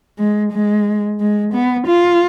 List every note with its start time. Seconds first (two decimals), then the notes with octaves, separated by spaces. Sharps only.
0.18 G#3
0.52 G#3
1.20 G#3
1.53 B3
1.87 F4